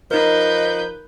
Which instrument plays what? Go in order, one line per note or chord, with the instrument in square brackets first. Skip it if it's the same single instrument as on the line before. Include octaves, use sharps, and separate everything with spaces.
[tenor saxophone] F3 [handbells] D#4 A#4 [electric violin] B4 G6 [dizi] D#5